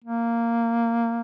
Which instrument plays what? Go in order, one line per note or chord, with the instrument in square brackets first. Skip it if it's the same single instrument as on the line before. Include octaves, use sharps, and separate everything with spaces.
[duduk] A#3